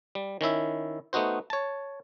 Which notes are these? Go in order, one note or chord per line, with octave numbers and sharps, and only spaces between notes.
G3
D#3 C#4 E4 E5
A3 B3 D#4 F#4 C5
C#5 A5